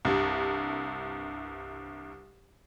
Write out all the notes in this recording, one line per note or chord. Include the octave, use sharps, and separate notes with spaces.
C2 G2 C3